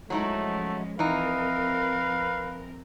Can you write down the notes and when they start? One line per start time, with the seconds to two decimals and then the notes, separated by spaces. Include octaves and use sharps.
0.10 F3 F#3 G#3 A3 C#4 D#4 E4
0.99 E3 F3 C4 D#4 A#4 B4 F5